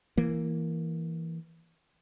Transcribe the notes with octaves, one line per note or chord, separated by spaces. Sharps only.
E3 A#3